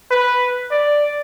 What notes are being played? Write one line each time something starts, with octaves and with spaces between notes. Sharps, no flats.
B4
D5